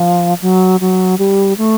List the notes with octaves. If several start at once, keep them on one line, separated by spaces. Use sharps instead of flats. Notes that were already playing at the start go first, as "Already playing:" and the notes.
Already playing: F3
F#3
F#3
G3
A3